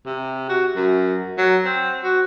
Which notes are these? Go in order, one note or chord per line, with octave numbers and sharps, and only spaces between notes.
C3
F#4
F#2
F#3
C4
F#4